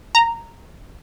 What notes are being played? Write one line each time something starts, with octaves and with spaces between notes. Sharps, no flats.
A#5